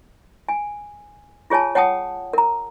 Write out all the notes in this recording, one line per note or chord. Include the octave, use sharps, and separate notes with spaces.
G#5
F4 G#4 C#5 G#5 A5
C#5 F#5 G5 A5 D#6
A#4 A#5